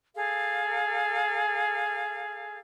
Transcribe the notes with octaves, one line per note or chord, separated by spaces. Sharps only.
G#4 A4 F5